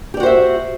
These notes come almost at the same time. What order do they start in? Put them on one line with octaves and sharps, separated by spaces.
G4 D5 F#4 C5 E5